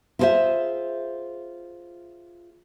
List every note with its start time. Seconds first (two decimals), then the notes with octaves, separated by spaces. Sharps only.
0.19 E4 F4 G#4 A4 C5 E5